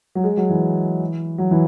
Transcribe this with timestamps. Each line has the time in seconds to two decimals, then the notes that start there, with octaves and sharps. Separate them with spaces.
0.15 F#3
0.24 G#3
0.37 F#3
0.50 E3
1.38 F#3
1.51 E3